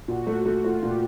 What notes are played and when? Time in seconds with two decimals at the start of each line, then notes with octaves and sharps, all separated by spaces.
0.08 A#2 F#4
0.27 A3 F#4
0.45 A3 F#4
0.64 A3 F4
0.82 A#2 G4